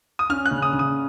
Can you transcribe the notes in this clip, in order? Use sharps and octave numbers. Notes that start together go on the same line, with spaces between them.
D#6
C#4 F6
F#6
C#3
D#6
C#3
D#6